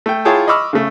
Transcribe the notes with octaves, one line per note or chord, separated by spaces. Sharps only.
A3 G5
E4 F4 G#4 C#5 G5 A5
D#5 B5 C#6 D6 E6 F6
C#3 A3